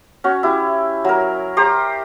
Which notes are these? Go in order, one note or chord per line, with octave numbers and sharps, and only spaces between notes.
C#4 F#4
E4 G4
F#3 A#4
G4 C5 A#5